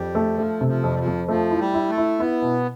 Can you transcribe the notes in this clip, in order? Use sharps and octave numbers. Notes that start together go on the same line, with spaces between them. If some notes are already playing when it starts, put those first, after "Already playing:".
Already playing: F2 G3
A3
F3 A3
C3
F3
F2
G3
F3
F2
F3 A3
E4
G3
E4
A3
E4
B3 E4
B2